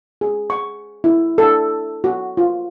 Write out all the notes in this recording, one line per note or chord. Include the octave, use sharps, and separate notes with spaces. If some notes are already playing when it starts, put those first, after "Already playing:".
G#4
C#6
E4
A4
F#4
F4